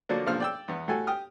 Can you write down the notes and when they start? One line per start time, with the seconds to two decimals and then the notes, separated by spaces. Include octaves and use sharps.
0.09 D3 F3 F#3 A#3 D4
0.27 B1 G2 A#2 F3 F6
0.40 D5 G5 E6
0.68 E2 B3
0.88 A2 F#4 G4 A4 G#5
1.07 G4 D#6 F6